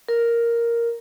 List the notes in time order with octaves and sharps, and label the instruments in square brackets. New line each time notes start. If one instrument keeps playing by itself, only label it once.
[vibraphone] A#4